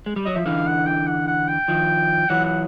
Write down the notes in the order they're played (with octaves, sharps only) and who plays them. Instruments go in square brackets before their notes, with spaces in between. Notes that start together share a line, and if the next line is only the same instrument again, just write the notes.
[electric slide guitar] G#3
G3
[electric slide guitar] F#3 [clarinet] D#5
[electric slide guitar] F3 [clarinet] E5
[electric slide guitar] D3 E3 [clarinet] F5
[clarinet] F#5
G5
F#5
F#5
G5
[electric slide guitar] D#3 F3
[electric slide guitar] E3 F#3 [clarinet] F#5
[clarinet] F#5